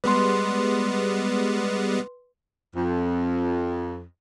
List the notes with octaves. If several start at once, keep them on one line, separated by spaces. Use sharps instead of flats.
G3 G#3 B3 B4 C6
F2